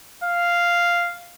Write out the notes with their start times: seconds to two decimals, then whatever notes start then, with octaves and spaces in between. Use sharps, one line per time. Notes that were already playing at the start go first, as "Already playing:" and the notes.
0.24 F5